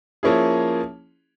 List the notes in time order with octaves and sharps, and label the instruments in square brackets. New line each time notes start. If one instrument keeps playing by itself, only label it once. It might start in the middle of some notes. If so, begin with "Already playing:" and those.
[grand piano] F3 A#3 C#4 E4 G#4